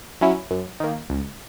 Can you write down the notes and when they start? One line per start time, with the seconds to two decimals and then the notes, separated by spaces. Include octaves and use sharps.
0.21 F#3 C#4 E4
0.51 F#2
0.80 D#3 A#3
1.10 C#2